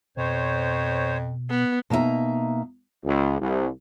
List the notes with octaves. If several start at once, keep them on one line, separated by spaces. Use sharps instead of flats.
F2 B2 C5 C#5
B3
B2 A#3 D#4 E4 E5 A#5
C#2
C2